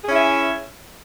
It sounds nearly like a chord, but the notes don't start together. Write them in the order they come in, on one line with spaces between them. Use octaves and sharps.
G#4 C#4 E4 E5